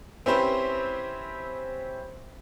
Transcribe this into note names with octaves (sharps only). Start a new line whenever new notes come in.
C4 C#4 E4 G4 B4 C5